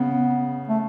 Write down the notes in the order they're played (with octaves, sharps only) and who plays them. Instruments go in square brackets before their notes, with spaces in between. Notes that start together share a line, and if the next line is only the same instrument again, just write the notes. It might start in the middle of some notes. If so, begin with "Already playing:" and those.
Already playing: [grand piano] C#3 [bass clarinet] B3
[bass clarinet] A3